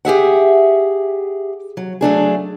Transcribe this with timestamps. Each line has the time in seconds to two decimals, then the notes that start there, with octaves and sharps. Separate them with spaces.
0.05 G4 G#4 E5 F#5
1.77 F#3
2.01 F#3 A3 D4 G#4